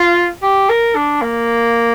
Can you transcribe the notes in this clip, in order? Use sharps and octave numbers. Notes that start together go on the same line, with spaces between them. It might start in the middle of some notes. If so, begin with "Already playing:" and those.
Already playing: F4
G4
A#4
D4
A#3